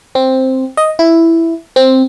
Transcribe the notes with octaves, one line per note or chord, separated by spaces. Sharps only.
C4
D#5
E4
C4